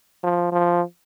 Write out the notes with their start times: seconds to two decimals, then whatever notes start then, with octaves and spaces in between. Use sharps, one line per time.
0.24 F3
0.52 F3